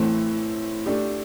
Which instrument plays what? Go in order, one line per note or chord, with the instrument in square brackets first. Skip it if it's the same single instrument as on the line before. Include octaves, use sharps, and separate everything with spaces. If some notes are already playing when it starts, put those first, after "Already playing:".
Already playing: [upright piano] A2 E3 A3 C4
A3 D4 G4